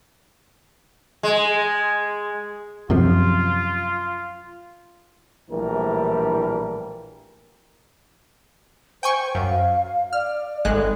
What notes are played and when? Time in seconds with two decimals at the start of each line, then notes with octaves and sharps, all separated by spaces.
1.23 G#3
2.90 F#2 C3 F3 F4
5.51 A#1 A2 E3 G3 D4 A#4
9.03 C5 G5 G#5 C#6
9.35 F#2 F5
10.13 D5 F6
10.65 G#1 G#3 A4 F#6